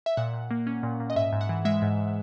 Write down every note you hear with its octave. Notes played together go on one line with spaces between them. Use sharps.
E5
A#2 F#5
A#2
A#3
C#4
A#2
A#2
D#5
G#2 E5
G#2
F#5
E3
G#3 E5
G#2